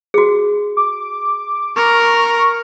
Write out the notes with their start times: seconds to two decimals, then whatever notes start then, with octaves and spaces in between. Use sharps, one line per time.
0.14 F#4 G#4
0.77 D6
1.76 A#4 C#6